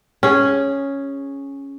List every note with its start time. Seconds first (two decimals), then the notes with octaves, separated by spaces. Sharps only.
0.23 C#4 G#4